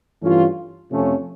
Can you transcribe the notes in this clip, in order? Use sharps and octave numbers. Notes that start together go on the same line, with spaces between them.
G2 E3 A3 C#4 F4
F2 C3 F3 A3 C#4